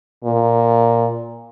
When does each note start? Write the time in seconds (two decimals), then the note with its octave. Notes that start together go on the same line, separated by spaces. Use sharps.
0.24 A#2